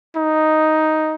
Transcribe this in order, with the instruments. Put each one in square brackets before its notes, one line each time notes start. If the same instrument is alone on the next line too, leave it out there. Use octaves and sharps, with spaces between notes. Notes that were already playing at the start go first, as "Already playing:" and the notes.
[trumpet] D#4